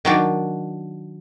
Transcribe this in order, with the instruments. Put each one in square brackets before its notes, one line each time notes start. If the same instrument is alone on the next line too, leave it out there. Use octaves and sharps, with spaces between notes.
[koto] D#3 F#3 D4